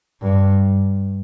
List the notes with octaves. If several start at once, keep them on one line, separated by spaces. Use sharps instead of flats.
G2